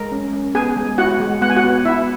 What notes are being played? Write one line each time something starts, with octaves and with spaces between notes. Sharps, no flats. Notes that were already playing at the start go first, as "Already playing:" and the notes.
Already playing: G#3 A#4 A#5
C#4
C#4
B3 G#4 G#5
G#3
E4 F#4 F#5
G#3
B3 F#5
G#5
F#4 F#5
B3
E4 E5